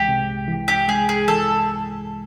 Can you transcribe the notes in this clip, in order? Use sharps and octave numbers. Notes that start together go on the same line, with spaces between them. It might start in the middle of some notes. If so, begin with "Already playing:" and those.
Already playing: C2 E3 G#3 G4
C3
E3
G4
G#3 G#4
G#4
E3 A4